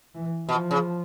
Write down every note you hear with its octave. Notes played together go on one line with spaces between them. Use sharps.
E3
B2 F3
C#3